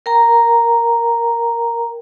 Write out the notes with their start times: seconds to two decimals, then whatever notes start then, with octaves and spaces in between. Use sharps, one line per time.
0.06 A#4 G5 A#5